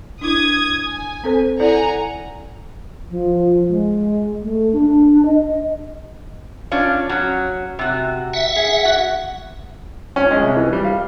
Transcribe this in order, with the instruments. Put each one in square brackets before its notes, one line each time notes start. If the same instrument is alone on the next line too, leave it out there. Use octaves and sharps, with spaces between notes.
[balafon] D4 E4 [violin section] D#6 G#6
[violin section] G#5
[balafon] C4 A4 C5
[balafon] E4 A4 D5 [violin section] F#5 G#5 A#5
[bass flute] F3
G#3
A3
D4
D#5
[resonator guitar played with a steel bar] C#4 D4 F4
F#3 C#4
C3 F#4
[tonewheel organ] E5 F#5
[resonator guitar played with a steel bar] G#4
F#4
[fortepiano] C#4
G#3
C2
E3
G3
F5